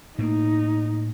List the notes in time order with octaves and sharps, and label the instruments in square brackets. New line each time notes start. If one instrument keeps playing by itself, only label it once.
[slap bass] A2 A#3 [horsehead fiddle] D#4